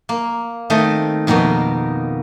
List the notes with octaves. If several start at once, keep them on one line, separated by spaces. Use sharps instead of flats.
A#3
D#3 A3 C4 D#5
F2 B2 D#3 A#3 B3